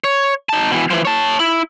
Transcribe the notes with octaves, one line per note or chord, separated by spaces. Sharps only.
C#5
D#4 A5
B2 E3
E3 F3
C#5 A5
E4